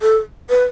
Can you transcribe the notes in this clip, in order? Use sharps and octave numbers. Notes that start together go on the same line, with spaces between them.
A4
B4